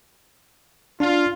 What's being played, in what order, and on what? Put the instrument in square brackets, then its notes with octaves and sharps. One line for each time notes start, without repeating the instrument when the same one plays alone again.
[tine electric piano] D4 [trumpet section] F4